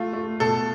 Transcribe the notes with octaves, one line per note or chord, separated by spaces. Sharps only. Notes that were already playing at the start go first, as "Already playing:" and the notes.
Already playing: A3 F4
A3
B2 A4